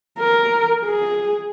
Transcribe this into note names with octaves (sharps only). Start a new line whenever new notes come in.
A#4
G#4